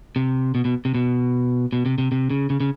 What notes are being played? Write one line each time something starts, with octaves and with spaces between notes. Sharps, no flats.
C3
B2
B2
C3
B2
B2
C3
C3
C3
C#3
C#3
C#3